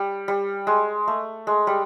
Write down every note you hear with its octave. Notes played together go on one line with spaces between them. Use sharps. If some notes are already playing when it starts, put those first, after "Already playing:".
Already playing: G3
G3
G#3
A3
G#3
G3